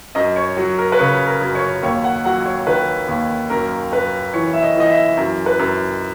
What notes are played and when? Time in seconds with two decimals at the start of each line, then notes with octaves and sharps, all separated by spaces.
0.15 F#2 D#5
0.36 C#5
0.57 F#3
0.78 A#4
0.92 B4
0.99 C#3 C#5
1.27 A#4
1.41 F#2
1.55 C#5
1.83 D#2 C#5
2.04 F#5
2.24 F#3 F#5
2.46 C#5
2.67 D#3 B4
3.08 D#2
3.50 F#2 A#4
3.92 F#2 B4
4.34 E3 C#5
4.53 E5
4.62 D#5
4.75 E3 D#5
4.90 E5
5.17 F#2
5.46 B4
5.59 F#2